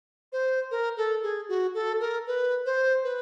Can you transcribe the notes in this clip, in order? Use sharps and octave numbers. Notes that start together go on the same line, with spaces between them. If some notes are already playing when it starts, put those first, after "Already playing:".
C5
A#4
A4
G#4
F#4
A4
A#4
B4
C5
B4